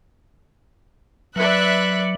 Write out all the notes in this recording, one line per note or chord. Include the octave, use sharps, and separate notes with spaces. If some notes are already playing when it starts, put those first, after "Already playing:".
F#3 B4 D5 E5 F#6